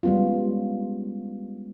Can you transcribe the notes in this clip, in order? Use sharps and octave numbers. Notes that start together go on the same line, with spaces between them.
G3 G#3 B3 C#4 F4